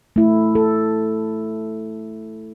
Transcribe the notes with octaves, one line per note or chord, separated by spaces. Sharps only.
A3 E4
A4